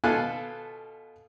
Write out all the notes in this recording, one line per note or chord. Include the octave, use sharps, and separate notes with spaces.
B2 F4 A4 G#5 F#6